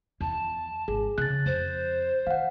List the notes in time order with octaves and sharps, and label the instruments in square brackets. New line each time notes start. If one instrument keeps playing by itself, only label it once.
[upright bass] E2 [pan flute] A5
[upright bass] G#1 [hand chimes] G#4
[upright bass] C#3 [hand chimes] F#6 A6
[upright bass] F2 [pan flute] C5
[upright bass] D#3 [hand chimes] F5 F#5